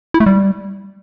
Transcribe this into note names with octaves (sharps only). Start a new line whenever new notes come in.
E4
A3
G3